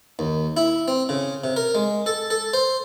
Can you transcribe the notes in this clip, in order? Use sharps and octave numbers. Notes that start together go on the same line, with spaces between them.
D#2
E4
C4
C#3
C3
A#4
G#3
A4
A4
C5